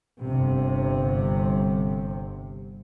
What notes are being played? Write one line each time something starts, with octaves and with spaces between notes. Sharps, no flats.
G1 C3